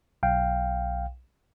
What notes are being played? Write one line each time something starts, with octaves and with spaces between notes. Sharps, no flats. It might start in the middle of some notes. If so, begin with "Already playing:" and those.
B1 F5 G5